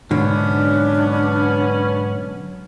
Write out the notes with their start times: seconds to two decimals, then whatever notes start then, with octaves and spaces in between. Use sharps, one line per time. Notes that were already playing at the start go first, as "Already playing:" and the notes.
0.11 B1 G#2 D3 B3 C#4 D4